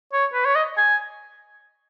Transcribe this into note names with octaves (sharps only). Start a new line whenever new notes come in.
C#5
B4
C#5
D#5
G#5